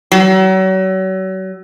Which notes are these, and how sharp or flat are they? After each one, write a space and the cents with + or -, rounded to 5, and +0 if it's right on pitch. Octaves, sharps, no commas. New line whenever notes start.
F#3 +35